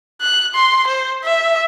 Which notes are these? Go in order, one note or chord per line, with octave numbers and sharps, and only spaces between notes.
F#6
C6
C5
E5